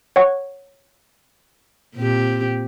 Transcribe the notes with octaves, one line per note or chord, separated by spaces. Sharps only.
C#5 F#5 C#6
A#2 C4 G4